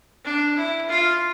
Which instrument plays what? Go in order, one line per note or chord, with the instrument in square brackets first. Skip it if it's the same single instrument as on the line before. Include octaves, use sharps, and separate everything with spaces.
[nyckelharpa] D4
E4
F4